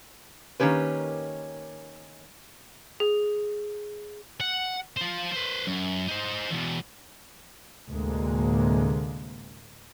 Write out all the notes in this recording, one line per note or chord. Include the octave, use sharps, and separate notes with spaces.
D#3 A#3 C#4 G4 B4
G#4
F#5
F4 C5
B4 C5
F#2
D#4 C5
E2 B2
D2 A2 C3 G#3 A#3